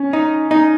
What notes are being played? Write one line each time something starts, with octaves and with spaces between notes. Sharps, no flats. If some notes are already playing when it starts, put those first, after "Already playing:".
Already playing: C#4
D#4
D#4